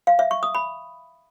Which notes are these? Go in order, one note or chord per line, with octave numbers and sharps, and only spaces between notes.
F5
E5
C#6
D#6
B5